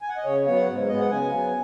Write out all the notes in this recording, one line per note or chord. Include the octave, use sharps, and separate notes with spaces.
G#5
F#5
D#5
C#3 C#5
F#3 B3 C#5
F#5
G#2
G#3 B3 D#5
F#5
C#3 G#5
F#3 B3